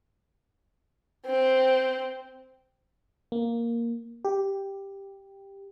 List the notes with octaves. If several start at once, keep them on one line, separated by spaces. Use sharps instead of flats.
C4
A#3
G4